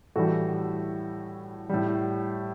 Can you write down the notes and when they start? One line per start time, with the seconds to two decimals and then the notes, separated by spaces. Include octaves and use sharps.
0.15 A2 E3 G3 F#4 A4
1.69 A2 G3